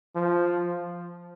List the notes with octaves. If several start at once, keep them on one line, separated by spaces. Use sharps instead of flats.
F3